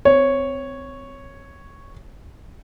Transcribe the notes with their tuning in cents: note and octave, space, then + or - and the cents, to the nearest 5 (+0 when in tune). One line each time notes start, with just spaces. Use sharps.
C4 -30 C#5 -5